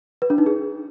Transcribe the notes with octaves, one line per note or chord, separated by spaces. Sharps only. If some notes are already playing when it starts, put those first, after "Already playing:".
B4
D4
D#4
G#4